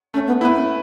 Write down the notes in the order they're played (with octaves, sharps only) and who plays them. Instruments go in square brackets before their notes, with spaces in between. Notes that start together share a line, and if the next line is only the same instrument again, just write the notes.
[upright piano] A3 [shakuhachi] C#4
[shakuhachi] B3
[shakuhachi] B3 [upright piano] E4
[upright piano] B4
[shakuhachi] C#4